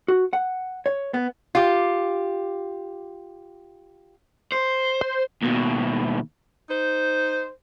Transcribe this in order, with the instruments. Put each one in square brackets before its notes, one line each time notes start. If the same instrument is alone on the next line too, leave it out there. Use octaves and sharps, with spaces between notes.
[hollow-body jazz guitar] F#4
F#5
C#5
B3
[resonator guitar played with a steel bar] F4 G4
[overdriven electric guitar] C5
[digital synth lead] C5
[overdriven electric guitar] D#2 B2
[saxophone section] D#4 C5